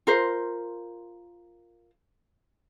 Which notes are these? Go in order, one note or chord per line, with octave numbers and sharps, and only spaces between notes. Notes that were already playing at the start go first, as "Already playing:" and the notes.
F4 A#4 C5